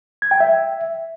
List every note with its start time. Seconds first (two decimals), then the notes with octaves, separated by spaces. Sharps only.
0.22 G#6
0.31 G5
0.40 E5